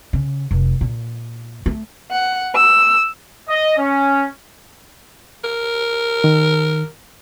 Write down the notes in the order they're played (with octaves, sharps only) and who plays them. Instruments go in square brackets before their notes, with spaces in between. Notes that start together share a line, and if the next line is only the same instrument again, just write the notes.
[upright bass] C#3
F1
A#2
A3
[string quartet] F#5
E6
[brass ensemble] D#5
C#4
[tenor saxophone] A#4
[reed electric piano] D#3